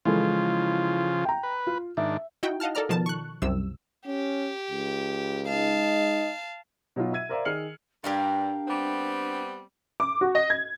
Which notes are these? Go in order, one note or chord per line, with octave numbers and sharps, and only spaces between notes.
C#3 E3 F3 G#3 F4 A4
G5 A#5
B4
F4
G#2 D#3 D4 E5
D#4 E4 F#4 G5
D#5 F5 F#5 A5 F6
A4 A#4 D5 A#5 F6
B2 D#3 F3 A5
C#6 F#6
C2 F#2 C3 E6
C#4 G4
C#2
G#3 D#4 D#5 F5 A5
B2 F#3 D#4 F4
E5 E6 G#6 D#7
A#4 C5 D5 E5 F5 A#5
D#3 G#4 F6 C7 C#7 F#7
G2 D4 G4 A#4 F5
G3 B3 C4
D6
F#4
D#5
G#6